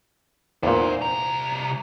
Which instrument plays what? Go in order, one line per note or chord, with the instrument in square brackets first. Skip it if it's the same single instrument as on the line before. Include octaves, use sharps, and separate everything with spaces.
[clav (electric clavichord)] E2 A#2 [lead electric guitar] C5 F#5
[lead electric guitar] C2 A#5